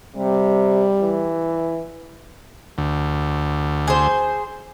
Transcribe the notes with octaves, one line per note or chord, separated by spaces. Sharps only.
C3 G3
E3
D2
G#4 C5